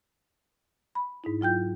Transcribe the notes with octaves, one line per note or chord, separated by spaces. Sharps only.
B5
G#2 D#4 E4
F#3 F4 G5 G6